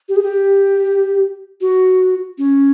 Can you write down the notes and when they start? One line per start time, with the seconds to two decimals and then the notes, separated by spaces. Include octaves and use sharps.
0.09 G4
0.16 G#4
0.23 G4
1.61 F#4
2.38 C#4